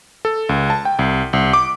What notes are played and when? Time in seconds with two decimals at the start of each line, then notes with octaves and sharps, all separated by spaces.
0.25 A4
0.49 C#2
0.70 A5
0.85 G5
0.99 C2
1.33 C2
1.53 D6